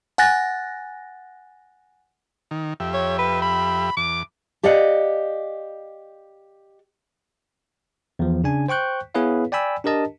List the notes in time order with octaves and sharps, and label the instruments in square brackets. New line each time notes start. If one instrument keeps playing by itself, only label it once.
[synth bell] F#5 G#5 F#6 A6 A#6
[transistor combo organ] D#3
F2 G4 E5
[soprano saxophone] C#5
B4
B5
[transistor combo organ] E2 [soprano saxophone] D6
[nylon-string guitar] G4 D5 D#5 F5 F#5
[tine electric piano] E2 F3
C#3 D4 G#5
C5 G5 C#6 F#6 G6
B3 E4 G#4 B4 C#5 F5
D5 G5 G#5 B5 E6
D4 G4 A#4 D#5 A5